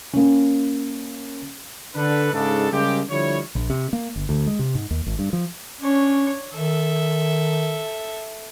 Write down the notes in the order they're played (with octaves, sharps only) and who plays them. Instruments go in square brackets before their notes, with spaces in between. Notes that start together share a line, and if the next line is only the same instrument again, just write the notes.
[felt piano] A#3 C#4
[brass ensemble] D3 D4 A4 B4
G#2 C#3 D4 A4
C#3 G3 G#3 A#3 C4 G4
D3 F3 G3 E4 C#5
[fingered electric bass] A#1
C3
A#3
G1
D2
G#3
C3
G#2
D#2
G#1
G2
F3
[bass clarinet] C#4 [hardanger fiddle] D4 C#5
[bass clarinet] D#3 [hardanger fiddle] A4 E5